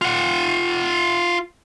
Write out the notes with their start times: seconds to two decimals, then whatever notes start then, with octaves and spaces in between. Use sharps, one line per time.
0.01 F4 F#5